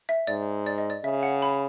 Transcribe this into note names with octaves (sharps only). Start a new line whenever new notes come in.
E5
G#2 D5
D5
D#5
D5
C#3 E5
F#5
B5